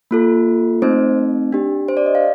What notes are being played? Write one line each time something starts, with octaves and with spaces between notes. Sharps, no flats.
A#3 F4 A4
A3 C4 D#4 C5
D4 G4
C5
D5
D#5
F5